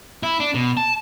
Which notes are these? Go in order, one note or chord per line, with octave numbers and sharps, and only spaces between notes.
E4
D4
B2
A5